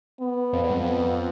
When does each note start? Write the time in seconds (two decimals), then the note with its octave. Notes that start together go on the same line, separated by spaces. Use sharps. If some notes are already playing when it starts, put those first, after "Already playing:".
0.20 B3
0.53 F2
0.64 E2
0.70 G2
0.74 F2
0.85 B3